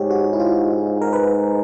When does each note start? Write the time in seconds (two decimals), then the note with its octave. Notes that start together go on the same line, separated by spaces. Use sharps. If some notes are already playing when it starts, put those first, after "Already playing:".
Already playing: G#2 G4 C#5
0.11 F#4
0.33 E4
0.40 F4
1.02 A#4
1.13 B4